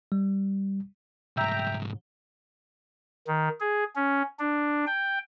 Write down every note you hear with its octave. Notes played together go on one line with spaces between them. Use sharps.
G3
C2 G#2 E5 G5 A#5
D#3
G#4
C#4
D4
G5